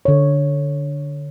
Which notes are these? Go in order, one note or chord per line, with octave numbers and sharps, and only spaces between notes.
D3 C#5